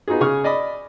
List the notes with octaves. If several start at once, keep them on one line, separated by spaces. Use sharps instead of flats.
B3 D#4 F4 F#4 G#4
C#3 G#4 G#5 C#6 F6
D5 D#5 B5